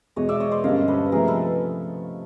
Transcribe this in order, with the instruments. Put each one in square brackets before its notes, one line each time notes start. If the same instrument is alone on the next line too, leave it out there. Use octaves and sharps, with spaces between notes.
[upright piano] E2 B2 G#3 [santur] C#5 D#5
[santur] D5 E5
C#5 D#5
C5 D5
[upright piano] G2 D3 G3 A#3 C#4 [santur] D#5 F5
[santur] A4 B4
[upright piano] C3 F3 A3 [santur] G#4 A#4
[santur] A4 B4